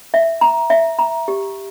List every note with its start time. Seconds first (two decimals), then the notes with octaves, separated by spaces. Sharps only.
0.14 E5
0.41 A#5
0.70 E5
0.99 A#5
1.28 G4